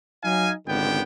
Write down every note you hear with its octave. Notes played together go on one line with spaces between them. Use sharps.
F#3 D#4 F5 G#5
G#1 C#2 D3 B3 G5